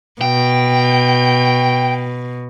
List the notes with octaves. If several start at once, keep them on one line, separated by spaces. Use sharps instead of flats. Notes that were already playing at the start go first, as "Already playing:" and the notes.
B2 G5